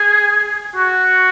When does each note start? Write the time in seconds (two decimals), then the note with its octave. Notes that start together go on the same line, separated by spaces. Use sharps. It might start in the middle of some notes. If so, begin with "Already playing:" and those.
Already playing: G#4
0.76 F#4